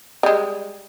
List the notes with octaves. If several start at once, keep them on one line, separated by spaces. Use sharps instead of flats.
G3 G#3